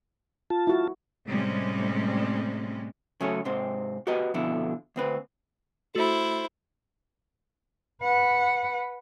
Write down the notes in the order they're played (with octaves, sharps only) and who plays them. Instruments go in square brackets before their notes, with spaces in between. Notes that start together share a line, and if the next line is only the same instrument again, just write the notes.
[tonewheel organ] F4 A5
[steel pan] E4 F#4
[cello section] A2 C3 G3 G#3 C4 C#4
[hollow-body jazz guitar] C#3 F#3 A3 C#4
G#2 C3 C4 C5
F#4 G4 A#4 B4 D#5
F2 B2 D3 E4
D2 C4 B4
[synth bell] A3 F#4 A4 [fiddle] E4 C5
[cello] B4 F#5